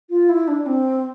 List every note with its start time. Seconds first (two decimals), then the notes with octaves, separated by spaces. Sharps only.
0.10 F4
0.29 E4
0.48 D4
0.66 C4